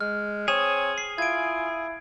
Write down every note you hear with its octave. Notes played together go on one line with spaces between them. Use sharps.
G#3 F6
C4 G#4 C#5 E7
C7
E4 F4 G#6 D7